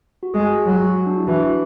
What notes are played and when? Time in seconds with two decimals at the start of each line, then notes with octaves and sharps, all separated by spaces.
0.23 F#4
0.34 G#3 G#4
0.50 F#4
0.62 F#3 G#4
0.73 F#4
1.06 D4
1.17 E4
1.27 E3 F#4